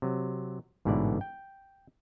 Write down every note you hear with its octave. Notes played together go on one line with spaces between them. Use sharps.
C3 F#3
A1 G#2 B2 D3 E4 D5
G5